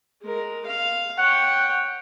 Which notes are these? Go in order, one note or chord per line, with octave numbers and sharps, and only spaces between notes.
G#3 A#4
F5
C#5 F#5 G5